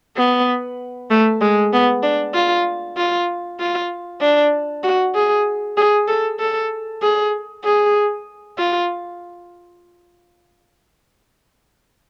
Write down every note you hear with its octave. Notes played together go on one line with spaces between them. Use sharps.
B3
A3
G#3
B3
D4
F4
F4
F4
D4
F#4
G#4
G#4
A4
A4
G#4
G#4
F4